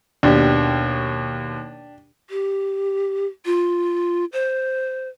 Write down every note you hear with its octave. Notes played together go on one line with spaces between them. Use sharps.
D#2 B2 D4 G4
G4
F4
C5